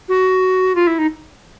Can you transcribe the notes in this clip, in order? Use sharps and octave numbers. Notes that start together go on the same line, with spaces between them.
F#4
F4
E4
D#4